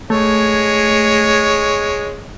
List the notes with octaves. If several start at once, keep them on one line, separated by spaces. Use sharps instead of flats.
G#3 A3 C#5